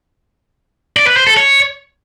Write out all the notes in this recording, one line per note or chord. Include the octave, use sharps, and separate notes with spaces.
D5
B4
C5
A4
C#5